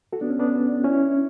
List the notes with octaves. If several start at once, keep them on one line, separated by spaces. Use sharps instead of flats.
F#4 A4
B3 D4
C#4
B3 D4
C#4 E4